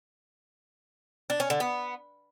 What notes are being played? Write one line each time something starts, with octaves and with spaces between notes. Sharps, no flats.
D4
C#4
D3
B3